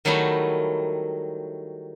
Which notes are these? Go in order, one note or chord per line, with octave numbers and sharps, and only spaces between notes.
D#3 F#3 G3 A3 D#4 E4